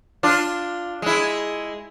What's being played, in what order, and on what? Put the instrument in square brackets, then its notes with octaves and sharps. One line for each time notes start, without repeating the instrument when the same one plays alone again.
[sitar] D4 F4
G#3 E4